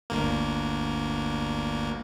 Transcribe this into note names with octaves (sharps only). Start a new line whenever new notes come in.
G1 D2 A#3